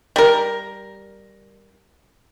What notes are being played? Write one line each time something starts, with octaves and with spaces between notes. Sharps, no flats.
G3 A#4